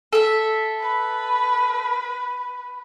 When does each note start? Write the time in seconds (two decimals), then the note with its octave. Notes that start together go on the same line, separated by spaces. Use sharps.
0.13 A4 E5
0.81 B4